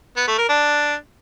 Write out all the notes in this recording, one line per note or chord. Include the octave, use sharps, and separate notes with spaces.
B3
A3
A#4
D4